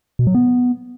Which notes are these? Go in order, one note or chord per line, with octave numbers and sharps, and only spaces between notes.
B2
F#3
B3